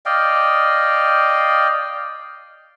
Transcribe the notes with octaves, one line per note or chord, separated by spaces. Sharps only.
D5 D#5 F5 G5